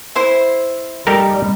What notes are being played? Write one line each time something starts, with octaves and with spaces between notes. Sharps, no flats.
E4 C5 E5
G3 D#4 G4 A4 A#4